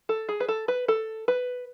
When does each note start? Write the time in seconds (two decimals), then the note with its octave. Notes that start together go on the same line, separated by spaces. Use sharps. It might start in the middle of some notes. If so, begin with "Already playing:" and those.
0.09 A4
0.29 G#4
0.40 B4
0.48 A4
0.68 B4
0.88 A4
1.28 B4